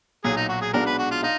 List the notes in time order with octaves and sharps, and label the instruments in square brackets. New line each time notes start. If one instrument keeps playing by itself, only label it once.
[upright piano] B1 A#2 F#3 [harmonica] G#4
[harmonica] D#4
F#4
G#4
[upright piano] B1 B2 G#3 D4 F#4 [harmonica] A#4
[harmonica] B4
F#4
F4
[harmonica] D#4 [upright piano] F4